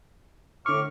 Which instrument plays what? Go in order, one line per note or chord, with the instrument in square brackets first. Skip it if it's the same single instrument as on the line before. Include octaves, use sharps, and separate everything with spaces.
[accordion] A2 D6 F6 [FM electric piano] D3 C#6